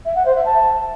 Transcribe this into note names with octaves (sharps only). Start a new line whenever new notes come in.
E5
F#5
C5
E5
A5